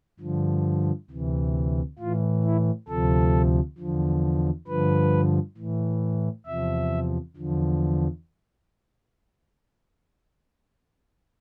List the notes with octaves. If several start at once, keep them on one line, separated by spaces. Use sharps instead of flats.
G2 D3 F3
D2 C3 E3
A2 E3 F4
E4
D2 C3 F3 A4
E2 D3 F3
G2 D3 F3 B4
A2 E3
E2 C3 F3 E5
E2 D3 F3